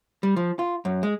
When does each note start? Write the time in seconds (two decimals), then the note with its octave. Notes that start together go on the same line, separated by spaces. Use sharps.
0.23 G3
0.36 F3
0.59 F4
0.85 F#2
1.03 G#3